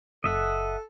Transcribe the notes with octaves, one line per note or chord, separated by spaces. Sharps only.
F#1 A4 D#5 E5 F#5